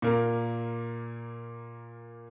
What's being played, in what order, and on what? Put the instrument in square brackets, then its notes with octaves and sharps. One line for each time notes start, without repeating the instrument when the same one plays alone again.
[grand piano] A#2 A#3 A#4